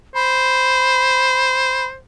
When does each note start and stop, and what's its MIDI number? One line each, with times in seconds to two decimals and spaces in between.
0.15 1.97 72
0.15 1.86 83